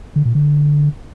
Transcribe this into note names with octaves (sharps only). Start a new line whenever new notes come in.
D3
A#2
D3